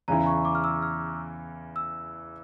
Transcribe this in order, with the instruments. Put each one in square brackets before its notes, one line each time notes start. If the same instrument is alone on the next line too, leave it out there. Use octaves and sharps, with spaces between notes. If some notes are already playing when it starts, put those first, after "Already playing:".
[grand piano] E2 C#3 E3 [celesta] A#5
[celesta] C#6
D6
F6
E6
F6
E6